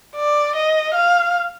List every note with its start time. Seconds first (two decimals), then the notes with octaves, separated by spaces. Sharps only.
0.17 D5
0.56 D#5
0.94 F5